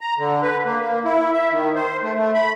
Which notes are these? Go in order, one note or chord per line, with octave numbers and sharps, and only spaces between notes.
A#5
D3
B4
A#3
A#3
E4
E5
D#3
C5
A3
A3
B5